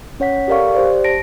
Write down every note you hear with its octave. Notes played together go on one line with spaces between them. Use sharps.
C#4 C#5 F#5 B6
G4 A4 A#4 D5 F5 C#6
G4 C5 D5
A5 A#6 D7